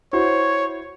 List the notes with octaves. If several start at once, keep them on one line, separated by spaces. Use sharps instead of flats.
E4 F#4 C5 C#5